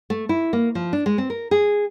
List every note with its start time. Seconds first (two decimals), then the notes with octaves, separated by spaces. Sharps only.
0.10 A3
0.29 E4
0.53 A#3
0.75 F3
0.93 D4
1.06 G#3
1.18 C4
1.30 A#4
1.51 G#4